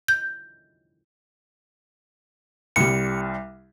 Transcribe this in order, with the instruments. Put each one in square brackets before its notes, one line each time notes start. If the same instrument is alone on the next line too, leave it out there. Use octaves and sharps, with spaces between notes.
[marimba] G6
[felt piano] C2 G3 [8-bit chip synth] C#7